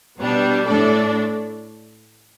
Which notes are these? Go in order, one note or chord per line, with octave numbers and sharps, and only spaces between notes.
B2 G3 B3 D4
A2 A3 D4 A4 D5